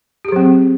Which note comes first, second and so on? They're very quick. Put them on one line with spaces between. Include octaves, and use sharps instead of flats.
G4 G#4 F#3 C4